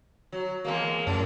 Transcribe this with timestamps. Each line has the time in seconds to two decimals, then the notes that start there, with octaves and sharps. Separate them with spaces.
0.32 F#3
0.64 E2 G#3 A#3
1.07 F#2 A2 D5